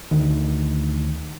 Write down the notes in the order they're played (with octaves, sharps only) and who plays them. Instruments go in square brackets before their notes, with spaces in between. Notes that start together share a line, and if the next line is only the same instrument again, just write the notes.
[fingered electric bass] D2 D#3